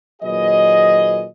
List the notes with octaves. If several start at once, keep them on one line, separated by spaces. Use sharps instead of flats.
D#2 A#2 F#3 G#4 B4 D#5